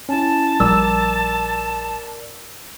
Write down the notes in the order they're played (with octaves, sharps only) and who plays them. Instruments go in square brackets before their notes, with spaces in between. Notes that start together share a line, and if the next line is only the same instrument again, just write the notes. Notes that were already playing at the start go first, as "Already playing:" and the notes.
[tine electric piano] C#4 E4 [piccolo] A5
[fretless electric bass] A#1 G3 [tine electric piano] A#4 D5 [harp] E6